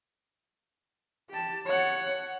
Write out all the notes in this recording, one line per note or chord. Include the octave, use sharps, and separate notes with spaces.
G4 A5
C#5 F#5